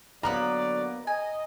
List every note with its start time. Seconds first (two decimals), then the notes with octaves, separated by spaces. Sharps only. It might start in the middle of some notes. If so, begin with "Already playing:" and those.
0.23 D3 F#3 A#3 B3 B4 D5 A#5
1.07 D#5 G#5